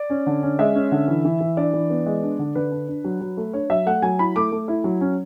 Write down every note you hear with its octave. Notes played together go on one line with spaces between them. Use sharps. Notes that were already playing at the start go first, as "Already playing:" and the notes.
Already playing: D5
C#4
D3
C#4
G#3 E5
C#4
D3
E3
E3
E3
D4 D5
E3
B3
G#3
D4
D3
D3 B4
D4
D4
F#3
F#3
A3
D4 C#5
F#3 E5
A3 F#5
F#3 G#5
E4 B5
A3 D6
A3
E4
F#3
C#4